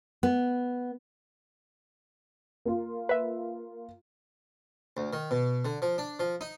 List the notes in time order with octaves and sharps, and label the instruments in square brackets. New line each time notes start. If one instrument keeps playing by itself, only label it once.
[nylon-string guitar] B3
[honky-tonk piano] A#3 F4
[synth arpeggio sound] B4 E5
[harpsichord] D2
D#3
B2
D3
F3
D4
F3
D#4